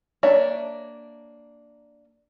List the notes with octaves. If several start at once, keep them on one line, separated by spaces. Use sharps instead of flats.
A#3 D4 C#5 E5